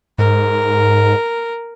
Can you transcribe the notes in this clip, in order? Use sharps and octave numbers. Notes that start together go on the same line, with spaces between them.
G#2 A#4